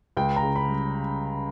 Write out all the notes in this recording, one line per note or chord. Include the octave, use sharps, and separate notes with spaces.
C#2 G5
A#5
C#3
B5
G3